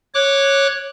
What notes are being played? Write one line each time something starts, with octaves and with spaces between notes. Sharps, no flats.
C#5 D6 F#6